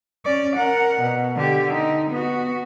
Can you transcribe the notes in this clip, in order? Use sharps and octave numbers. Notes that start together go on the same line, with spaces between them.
C#4 D5
A#4 F#5
B2
D3 G4
D#4
B3 F#4